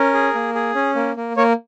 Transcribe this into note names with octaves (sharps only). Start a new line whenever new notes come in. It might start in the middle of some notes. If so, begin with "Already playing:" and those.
Already playing: C#4 A#4
G#4
A#3
G#4
C#4
A#3
A#3
A#3 C#5